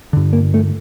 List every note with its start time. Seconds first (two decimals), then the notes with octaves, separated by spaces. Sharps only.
0.13 G2 D3
0.33 A#3
0.54 A3